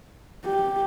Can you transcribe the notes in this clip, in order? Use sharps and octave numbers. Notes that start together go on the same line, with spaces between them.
G4